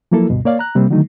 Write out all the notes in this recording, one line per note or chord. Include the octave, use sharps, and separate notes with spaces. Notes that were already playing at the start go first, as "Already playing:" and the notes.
F3 F#3 A#3 E4 A4
D2 G2 B2
A#3 C#5 D5 F5
A#5 F#6
C3 G3 A#3 C4
D3 D#3 F#3 A3 D#4